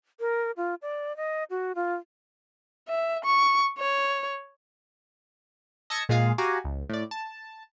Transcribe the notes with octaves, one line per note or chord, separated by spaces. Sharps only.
A#4
F4
D5
D#5
F#4
F4
E5
C#6
C#5
D#5 A5 E6 G#6 A#6 C#7
A#2 G#3 F4 G#4 F5
F#4 G4 F5 G#5 A#5
C#2
A2 D5
A5